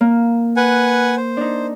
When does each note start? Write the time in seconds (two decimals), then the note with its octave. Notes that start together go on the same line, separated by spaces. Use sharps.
0.01 A#3
0.57 B4 F#5 G#5
1.17 C5
1.37 D4 D#4